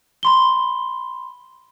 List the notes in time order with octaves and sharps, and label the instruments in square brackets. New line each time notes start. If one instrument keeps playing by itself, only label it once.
[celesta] B5 C6 G7